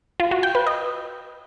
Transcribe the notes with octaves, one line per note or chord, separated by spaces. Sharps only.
F4
F#4
G5
B4
D#5